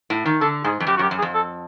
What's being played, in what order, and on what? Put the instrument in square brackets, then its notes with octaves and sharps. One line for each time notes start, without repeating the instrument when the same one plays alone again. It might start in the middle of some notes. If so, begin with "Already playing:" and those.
[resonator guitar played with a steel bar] A2
D#3
[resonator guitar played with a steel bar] D3 [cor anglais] A4
[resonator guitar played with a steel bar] G#2 [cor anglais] G#4
[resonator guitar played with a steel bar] F2
[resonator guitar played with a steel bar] F#2 [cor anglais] G4
[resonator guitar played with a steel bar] F#2 [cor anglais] F#4
[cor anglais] G4
[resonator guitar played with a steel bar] F#2
[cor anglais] G#4
[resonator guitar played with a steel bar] F2
[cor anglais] A4